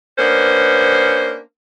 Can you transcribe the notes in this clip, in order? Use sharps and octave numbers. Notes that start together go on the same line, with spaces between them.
A#3 B3 C#4 D4 C5